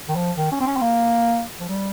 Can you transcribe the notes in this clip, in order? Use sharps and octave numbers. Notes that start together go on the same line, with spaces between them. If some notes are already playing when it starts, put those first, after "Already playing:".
D#3
F3
D#3
C#4
C4
C#4
C4
A#3
F3
G3